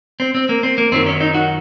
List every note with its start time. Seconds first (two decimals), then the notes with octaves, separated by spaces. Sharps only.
0.20 C4
0.35 C4
0.49 A#3
0.63 C4
0.78 A#3
0.92 F#2 D#3 F#3 C4
1.06 C#4
1.21 D#4
1.35 F#4